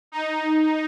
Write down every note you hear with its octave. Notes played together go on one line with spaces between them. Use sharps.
D#4